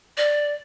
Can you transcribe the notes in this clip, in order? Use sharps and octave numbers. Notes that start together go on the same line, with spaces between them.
D5